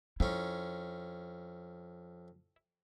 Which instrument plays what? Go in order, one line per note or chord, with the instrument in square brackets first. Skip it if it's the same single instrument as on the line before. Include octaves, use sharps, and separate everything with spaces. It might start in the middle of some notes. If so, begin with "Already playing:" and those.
[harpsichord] F2 C#4 [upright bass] E4